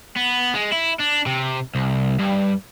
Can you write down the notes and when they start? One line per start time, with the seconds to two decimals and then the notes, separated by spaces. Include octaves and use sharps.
0.16 B3
0.54 G#3
0.72 E4
0.99 D4
1.26 C3
1.75 C2
2.19 G2